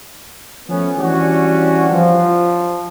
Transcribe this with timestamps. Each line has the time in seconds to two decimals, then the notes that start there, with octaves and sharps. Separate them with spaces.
0.68 F3 A3 B3 C#4
0.98 E3 G3 C#4 D4 F#4
1.90 F3